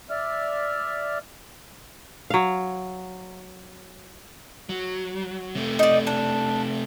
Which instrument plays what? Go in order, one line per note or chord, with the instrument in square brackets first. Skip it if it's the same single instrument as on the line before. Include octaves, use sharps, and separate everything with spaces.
[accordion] D5 E5 F6
[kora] F#3 F5
[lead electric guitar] F#3
C3 A3
[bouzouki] D#4 D5
D4